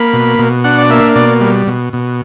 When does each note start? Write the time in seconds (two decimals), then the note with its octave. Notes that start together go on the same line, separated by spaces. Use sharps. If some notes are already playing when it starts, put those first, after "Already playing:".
Already playing: A#3 B5
0.13 B2
0.39 B2
0.64 D4 F#5
0.78 D5
0.90 A#3 E5
1.15 B2 D5
1.41 G3
1.67 B2
1.93 B2